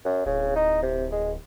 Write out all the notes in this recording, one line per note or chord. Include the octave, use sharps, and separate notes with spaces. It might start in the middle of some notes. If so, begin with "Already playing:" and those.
F#2
D1 C#3
D#4
C3
G#3